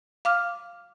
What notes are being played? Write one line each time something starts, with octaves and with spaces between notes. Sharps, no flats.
F5 D6 F6